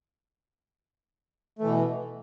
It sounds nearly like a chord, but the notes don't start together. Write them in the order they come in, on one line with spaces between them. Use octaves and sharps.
A3 E3 B2